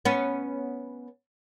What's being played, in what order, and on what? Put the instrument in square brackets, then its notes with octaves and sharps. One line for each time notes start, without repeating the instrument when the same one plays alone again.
[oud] B3 C#4